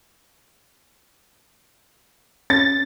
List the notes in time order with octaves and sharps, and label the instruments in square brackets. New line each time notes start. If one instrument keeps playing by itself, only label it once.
[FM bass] C#4 [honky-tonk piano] A6